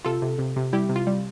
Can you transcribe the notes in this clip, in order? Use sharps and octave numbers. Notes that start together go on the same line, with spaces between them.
C3 F4 A4
C3
C3
C3
G3 E4 G4
C3
F4
G3